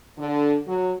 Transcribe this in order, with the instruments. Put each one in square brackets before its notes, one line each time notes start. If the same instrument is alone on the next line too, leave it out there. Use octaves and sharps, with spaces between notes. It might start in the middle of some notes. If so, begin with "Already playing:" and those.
[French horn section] D3
F#3